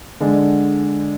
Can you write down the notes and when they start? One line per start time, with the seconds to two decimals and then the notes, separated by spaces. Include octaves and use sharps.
0.20 D3 G#3 D4